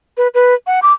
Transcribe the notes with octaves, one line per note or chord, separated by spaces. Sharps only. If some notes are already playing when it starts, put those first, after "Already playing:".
B4
B4
F#5
D6